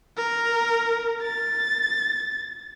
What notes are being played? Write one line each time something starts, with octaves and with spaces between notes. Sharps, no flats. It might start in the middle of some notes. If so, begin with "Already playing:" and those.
A#4
A6